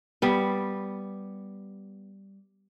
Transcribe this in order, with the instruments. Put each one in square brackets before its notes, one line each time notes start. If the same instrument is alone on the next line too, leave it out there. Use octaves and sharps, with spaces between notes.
[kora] G3 B3